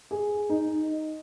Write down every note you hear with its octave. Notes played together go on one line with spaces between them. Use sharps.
G#4
D#4